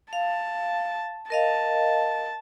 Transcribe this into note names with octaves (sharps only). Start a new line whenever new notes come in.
F5 A5
A#4 D#5 F5 A5